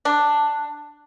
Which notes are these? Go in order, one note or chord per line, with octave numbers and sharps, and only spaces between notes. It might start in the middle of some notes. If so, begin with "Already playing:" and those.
D4